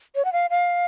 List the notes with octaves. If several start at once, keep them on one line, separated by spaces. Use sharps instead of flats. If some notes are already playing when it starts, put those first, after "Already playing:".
C#5
F#5
F5
F5